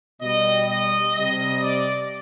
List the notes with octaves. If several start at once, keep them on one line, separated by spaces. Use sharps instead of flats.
B2 G3 D#5
D#5
C3 G3 D#5
D5